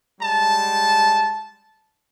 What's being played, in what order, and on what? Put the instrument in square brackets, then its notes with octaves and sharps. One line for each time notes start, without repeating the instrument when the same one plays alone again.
[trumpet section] G3 G#3 A5